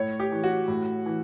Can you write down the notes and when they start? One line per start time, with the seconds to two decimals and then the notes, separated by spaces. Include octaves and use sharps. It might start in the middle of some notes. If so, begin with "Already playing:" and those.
Already playing: A2 C#5
0.20 G4
0.32 E3
0.44 F#4
0.68 A2
1.06 E3